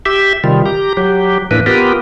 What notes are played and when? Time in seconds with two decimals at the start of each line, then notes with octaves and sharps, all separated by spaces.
0.06 G4 E5
0.44 C3 D#3 G3 F4
0.66 G4 A#5
0.97 F#3 G4
1.51 A2 E3 A#3 D4 B4
1.66 B3 F4 G4 A#4 B4